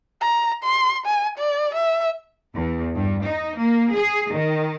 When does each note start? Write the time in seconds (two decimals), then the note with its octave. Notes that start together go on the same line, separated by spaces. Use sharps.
0.21 A#5
0.63 C6
1.06 G#5
1.38 D5
1.75 E5
2.54 E2
2.95 G2
3.24 D#4
3.58 A#3
3.94 G#4
4.32 D#3